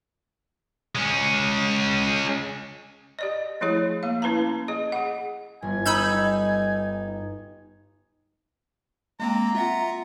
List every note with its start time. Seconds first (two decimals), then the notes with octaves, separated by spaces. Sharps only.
0.95 G#3 C#4
3.19 G4 D5 D#5
3.61 F3 A3 E4 G#4 C#5
4.03 A#3 F5
4.22 C#4 E4 B4 A5 A#5
4.68 G#4 D#5
4.92 G#4 F#5
5.62 G1 G#5
5.86 D#4 B5 E6 G6
9.20 G#3 A#3 C4 A#5
9.55 F4 E5 F#5